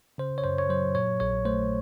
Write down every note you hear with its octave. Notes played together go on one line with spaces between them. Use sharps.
C#3 C5
C#5
F#2 C5
C#5
F#3 C5
A#2 C#5
A#1 C#5
A3 C5